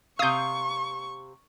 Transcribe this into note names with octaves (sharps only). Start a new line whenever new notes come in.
C3 F5 C#6 D#6 G6